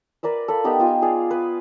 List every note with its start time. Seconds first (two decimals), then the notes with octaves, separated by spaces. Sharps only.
0.23 A#4 B4 D5 E5
0.48 A4 F5 B5
0.64 B3 D#4 G4 A#4
0.79 B3 F4 G5 G#5
1.02 G#4 D5 F5
1.31 B4